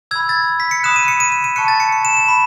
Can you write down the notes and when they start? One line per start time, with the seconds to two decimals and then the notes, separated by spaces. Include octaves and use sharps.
0.11 B5 E6 G#6
0.29 A6
0.60 B6
0.71 C#7
0.84 B5 D#6 F#6 E7
0.96 D#7
1.08 C#7
1.20 D#7
1.32 D#7
1.44 D#7
1.56 A5 C#6 F#6 C#7
1.68 A6
1.80 C#7
1.92 C#7
2.05 E7
2.17 E7
2.28 B5